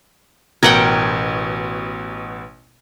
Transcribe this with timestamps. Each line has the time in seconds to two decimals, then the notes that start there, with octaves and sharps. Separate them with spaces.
0.63 A1 B2 A#4 F#5 G5 G#6